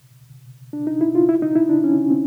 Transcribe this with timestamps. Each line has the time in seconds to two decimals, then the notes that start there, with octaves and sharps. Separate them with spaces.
0.73 D4
0.87 D#4
1.01 E4
1.15 F4
1.29 E4
1.42 D#4
1.56 E4
1.69 D4
1.84 C#4
2.10 C4